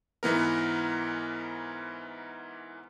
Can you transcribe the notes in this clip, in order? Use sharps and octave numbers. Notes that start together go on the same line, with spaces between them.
G#2 E3 B3 A#4